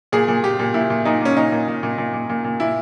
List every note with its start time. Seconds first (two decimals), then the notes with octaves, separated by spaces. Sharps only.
0.12 A#2 G#4
0.28 A#2
0.44 A#2 G4
0.59 A#2
0.74 A#2 E4
0.90 A#2
1.05 A#2 D#4
1.22 A#2 C#4
1.36 A#2 D#4
1.52 A#2
1.68 A#2
1.83 A#2
1.98 A#2
2.14 A#2
2.29 A#2
2.44 A#2
2.60 A#2 E4